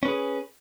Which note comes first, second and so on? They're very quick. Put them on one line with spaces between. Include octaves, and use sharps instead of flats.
C#4 B4 G#4